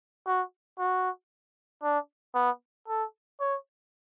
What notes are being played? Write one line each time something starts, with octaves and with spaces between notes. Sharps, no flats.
F#4
F#4
D4
B3
A4
C#5